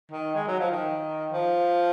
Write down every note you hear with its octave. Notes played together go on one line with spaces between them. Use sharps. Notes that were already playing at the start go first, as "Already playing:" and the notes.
D#3
G#3
F#3
F3
D#3
F3